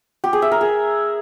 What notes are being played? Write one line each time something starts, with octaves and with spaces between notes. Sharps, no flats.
G4
G#4
E5
A#4
G#4